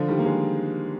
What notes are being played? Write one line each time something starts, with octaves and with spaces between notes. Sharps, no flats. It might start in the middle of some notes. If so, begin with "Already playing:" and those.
Already playing: D3 F3
D#3 G3
A#3
F3 G#3